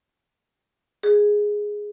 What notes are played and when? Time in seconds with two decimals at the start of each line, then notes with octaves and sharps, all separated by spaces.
1.03 G#4